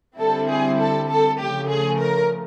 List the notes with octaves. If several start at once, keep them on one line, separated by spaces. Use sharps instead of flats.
D3 G3 C4 E4 A4
G#4
A4
A4
C#3 F3 A3 G4
G#4
A#4